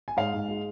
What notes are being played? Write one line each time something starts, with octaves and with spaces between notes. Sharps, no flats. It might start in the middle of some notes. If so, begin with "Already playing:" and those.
G#5
G#2 F5
G#2
G#3